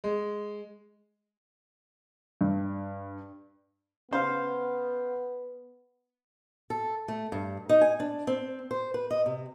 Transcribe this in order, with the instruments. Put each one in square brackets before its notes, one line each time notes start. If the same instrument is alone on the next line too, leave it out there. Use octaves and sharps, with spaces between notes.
[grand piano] G#3
G2
[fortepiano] C#3 C5 F5 [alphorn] B3
[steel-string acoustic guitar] A4
A3
G2
D#4
G#5
D4
C4
C5
B4
D#5
C3